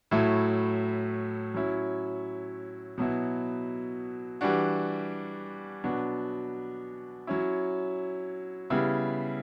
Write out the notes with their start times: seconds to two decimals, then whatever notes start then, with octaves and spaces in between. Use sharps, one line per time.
0.11 A2 F#3 A3 E4
1.54 F#3 C#4 E4
2.98 B2 F#3 B3 E4
4.41 E3 G3 D4 F#4
5.84 B2 F#3 B3 D4 F#4
7.27 F#3 C#4 E4
8.70 C#3 G3 B3 E4